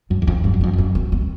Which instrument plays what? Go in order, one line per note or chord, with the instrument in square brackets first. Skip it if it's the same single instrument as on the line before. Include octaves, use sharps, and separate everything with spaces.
[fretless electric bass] F#2 [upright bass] D4
[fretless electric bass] E2
[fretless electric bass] F2 [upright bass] C#4
[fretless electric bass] G2 [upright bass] C#4
[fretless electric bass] F#2
[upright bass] D4
[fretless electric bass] F2
[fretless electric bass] F#2 [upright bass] C#4
[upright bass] C4
B3
C4